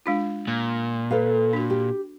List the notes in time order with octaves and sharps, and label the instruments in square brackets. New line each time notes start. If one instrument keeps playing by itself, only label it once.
[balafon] G#3 D4 F4
[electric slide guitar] A#2
[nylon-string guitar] A4 B4 F5
[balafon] D4 F#4
[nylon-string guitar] G4